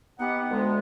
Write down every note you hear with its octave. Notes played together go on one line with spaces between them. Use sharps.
B3 D#4 G4 F#5
D2 G#3